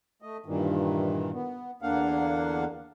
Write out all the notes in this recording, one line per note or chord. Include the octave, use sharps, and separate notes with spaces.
A3 D#5
G2 A#2 D#3 E3
B3
E2 D3 A#3 D4 F5 F#5